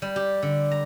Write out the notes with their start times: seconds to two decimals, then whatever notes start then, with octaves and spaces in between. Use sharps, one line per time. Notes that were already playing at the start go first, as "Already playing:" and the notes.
0.02 G3
0.16 G4
0.42 D3
0.71 A#5